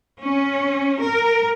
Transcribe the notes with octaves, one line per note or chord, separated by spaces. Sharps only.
C#4
A#4